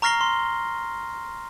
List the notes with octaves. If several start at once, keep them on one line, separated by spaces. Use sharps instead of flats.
A#5 C#6 F6 A#6 C7 G7
C6